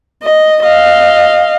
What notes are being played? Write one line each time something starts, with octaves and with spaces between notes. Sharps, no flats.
D#5
D#5 F5